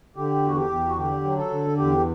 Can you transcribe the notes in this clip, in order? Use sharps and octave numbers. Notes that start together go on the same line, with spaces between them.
D3 G4
E2 F#4
G4
E2
F#4
D3 G4
F#3
A4
D3
E2 G4